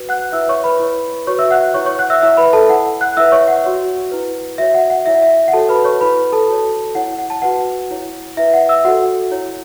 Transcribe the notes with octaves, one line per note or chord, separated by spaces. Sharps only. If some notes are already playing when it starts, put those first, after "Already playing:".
Already playing: F#4 B4
F#5 F#6
E4 B4 E5 E6
C#5 C#6
B4 B5
E4 C#5
F#4 B4 C#5 C#6
E5 E6
F#5 F#6
E4 B4 C#5 C#6
C#5 C#6
F#5 F#6
E5 E6
E4 C#5 E5 E6
B4 B5
A4 A5
E4 C#5 F#5
F#5 F#6
E4 B4 E5 E6
C#5 C#6
F#5
F#4 C#5
E4 B4
F#4 C#5 E5
F#5
F#5
E4 C#5 E5
E5
F#5
F#4 A4 C#5 A5
B4 B5
C#5 C#6
E4 B4 B5
A4 A5
F#4 C#5
E4 C#5 F#5
F#5
A5
F#4 B4 F#5
E4 C#5
E4 B4 E5
F#5
E5 E6
F#4 A4 C#5 F#5
E4 C#5